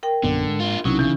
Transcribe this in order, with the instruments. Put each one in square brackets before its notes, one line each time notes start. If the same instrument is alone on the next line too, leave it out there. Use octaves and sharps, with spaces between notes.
[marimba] A#4 G5
[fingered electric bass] A#1 F#2 B3 [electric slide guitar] D3
[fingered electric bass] G#2
[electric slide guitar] D4 F4
[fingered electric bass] B1 C3 [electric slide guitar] F#3 [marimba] C#4 D#4 E4
[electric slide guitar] C#3 [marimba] E3